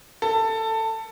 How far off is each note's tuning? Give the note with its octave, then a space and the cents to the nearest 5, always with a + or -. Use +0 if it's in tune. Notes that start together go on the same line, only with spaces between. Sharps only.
A4 +15